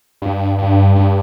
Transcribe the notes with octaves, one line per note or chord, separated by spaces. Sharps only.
G2
G2
G2